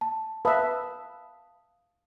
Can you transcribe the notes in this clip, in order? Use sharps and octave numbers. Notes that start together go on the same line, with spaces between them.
A5
B4 E5 F5 A5 D#6